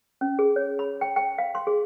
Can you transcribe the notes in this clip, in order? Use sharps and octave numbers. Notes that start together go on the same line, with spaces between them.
C#4
G#4
C#5
B5
G5
G5
F5
C6
G#4